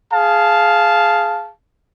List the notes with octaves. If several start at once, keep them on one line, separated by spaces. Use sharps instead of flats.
G#4 F5 A5